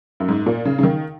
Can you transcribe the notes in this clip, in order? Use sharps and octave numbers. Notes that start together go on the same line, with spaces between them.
F#2
G#2
A#2
C#3
C#3
D#3